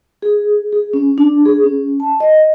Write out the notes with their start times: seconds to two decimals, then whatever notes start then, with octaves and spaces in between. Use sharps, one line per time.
0.22 G#4
0.73 G#4
0.94 C#4
1.18 D4
1.46 G#4
1.64 C#4
2.00 A5
2.20 D#5